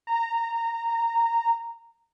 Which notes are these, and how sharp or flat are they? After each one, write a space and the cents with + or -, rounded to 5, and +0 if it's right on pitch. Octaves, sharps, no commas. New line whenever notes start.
A#5 -15